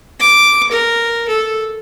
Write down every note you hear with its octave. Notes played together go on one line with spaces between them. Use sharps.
D6
A#4
A4